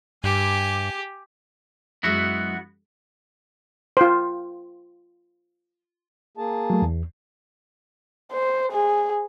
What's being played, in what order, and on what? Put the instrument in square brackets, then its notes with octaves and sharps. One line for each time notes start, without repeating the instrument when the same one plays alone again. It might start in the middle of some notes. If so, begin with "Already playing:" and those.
[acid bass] G2 [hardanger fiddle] G4 [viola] G#5 D6
[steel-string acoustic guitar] F#2 F#3 G#3 [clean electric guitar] B3 E4 F#4
[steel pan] F4 C5
[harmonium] A#3 G#4 A5
[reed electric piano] F#3 A3
E2
[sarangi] C5
G#4